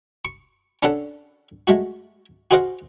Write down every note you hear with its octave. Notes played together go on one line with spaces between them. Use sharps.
C#6
C#4 D4 A4 F#5
G#3 A3 F#4
F#4 G#4 C5 D#5 F5 F#5